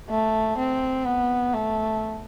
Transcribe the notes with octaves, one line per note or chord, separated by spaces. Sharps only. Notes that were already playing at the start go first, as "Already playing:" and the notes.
A3
C4
B3
A3